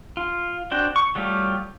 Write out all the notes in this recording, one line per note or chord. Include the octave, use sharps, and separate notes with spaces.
F4
C4 D4 F#4 G5
C#6
F#3 G3 A3 F4 G4